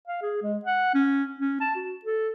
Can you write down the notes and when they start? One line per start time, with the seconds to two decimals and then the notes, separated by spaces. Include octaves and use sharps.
0.08 F5
0.22 G#4
0.43 G#3
0.65 F#5
0.95 C#4
1.39 C#4
1.61 A5
1.76 F#4
2.05 A4